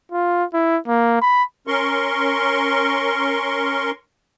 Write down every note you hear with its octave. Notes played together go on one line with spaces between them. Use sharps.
F4
E4
A#3
B5
C#4 A#4 C6 C#6